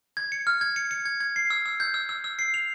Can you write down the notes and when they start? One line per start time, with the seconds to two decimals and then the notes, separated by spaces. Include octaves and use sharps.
0.17 G#6
0.32 C#7
0.47 F6
0.61 G#6
0.76 C#7
0.91 C#7
1.05 G#6
1.21 G#6
1.36 C7
1.50 E6
1.66 E6
1.80 G6
1.94 E6
2.09 E6
2.24 E6
2.39 C7
2.54 F7